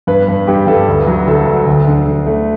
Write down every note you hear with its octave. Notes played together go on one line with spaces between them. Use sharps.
G2 B4
G2
G2 G4
G2 A4
D2
F#3
D2 A4
D2
D2
D3
D3
A3